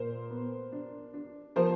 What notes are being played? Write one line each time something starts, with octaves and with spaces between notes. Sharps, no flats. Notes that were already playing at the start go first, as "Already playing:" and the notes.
Already playing: A#2 A#4 C5
B3
D4
D4
F3 A#4 C5